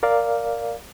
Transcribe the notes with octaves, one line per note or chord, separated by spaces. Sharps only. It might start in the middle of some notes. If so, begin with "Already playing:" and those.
A#4 D5 F5